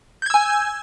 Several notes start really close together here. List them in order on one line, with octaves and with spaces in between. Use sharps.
G6 G#6 E6 G#5